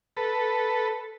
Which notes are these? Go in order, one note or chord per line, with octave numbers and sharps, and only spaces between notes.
A4 B4